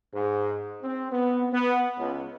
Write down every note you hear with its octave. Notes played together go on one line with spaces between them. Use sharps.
G#2
C4
B3
B3
C#2